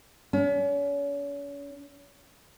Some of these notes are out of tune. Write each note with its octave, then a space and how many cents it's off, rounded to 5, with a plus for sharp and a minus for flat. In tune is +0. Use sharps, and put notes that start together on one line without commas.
C#4 +40